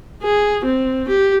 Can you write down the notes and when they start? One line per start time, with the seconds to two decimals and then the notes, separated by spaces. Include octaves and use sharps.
0.23 G#4
0.65 C4
1.08 G4